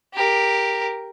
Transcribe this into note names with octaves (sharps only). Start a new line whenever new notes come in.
G4 A#4